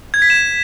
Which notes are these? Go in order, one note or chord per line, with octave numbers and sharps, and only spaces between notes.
G#6
B6
E7